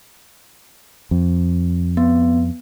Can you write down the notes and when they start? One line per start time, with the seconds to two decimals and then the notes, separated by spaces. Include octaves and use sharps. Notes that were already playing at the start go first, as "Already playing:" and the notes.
1.11 F2
1.97 B3